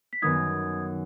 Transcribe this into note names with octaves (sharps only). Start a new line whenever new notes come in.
B6
F#2 D#3 B3 D#4 D#6 G#6